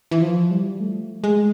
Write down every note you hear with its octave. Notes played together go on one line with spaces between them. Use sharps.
E3
F3
G3
A3
G#3